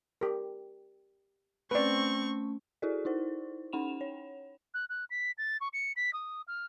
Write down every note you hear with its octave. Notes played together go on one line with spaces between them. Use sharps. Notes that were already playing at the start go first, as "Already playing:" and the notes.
G4 A#4
A3 C4 C#4 B4 D5 C#6
E4 F#4 G#4 A4 D5
D#4 E4 C5
C#4 D#4 F#5 B5 E7 F7
C#5
F#6
F#6
B6
A6
C#6
C#7
B6
D#6
F6